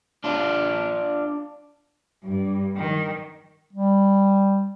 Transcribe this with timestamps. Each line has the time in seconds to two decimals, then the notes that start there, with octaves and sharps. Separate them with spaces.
0.24 D4 F4
2.23 G2
2.76 D#3
3.73 G3